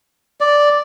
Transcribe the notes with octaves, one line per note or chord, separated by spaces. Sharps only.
D5